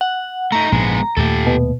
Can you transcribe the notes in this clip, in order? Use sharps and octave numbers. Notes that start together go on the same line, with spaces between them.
F#5
A3 D#4 A#5
A#1 G#2 C3 G#3 B3
D#2 A#2 A3 G4 A4
B2